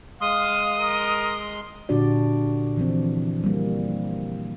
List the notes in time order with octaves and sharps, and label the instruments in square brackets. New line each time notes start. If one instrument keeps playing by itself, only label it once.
[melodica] G#3 C6 [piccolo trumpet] F5 [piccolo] D#6
[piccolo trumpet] A#4
[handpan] A#2 D3 D4 F#4 G4 D5
E3 F3 C4
G3 A#3